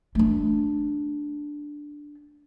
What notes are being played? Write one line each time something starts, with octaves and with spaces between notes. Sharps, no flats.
A3 D4